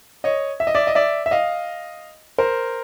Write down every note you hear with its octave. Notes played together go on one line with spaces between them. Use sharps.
C#5 D#5
E5
D#5
D5 E5
D#5
D5 E5
E5
D#5 F5
A#4 C5